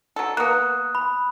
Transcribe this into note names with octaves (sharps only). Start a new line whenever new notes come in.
F#3 A4
A#3 B3 D#6 F#6
B5